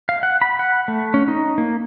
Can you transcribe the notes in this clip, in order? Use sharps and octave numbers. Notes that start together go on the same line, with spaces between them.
F5
F#5
B5
F#5
A3
C#4
D#4
A#3